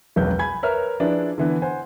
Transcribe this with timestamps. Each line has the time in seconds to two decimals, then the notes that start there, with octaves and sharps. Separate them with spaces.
0.16 E1 B1 F#2 B4 G6
0.39 G#5 B5 G#6
0.63 A#4 B4 C#5 E5 F6
1.00 F3 D4 E4 G#4 B4 D5
1.38 D3 E3 B3
1.62 C5 F#5 G#5